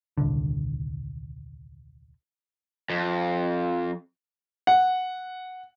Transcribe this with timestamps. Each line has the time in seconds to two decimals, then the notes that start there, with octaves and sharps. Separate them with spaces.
0.18 D#1 C2 D3
2.90 F2
4.67 F#5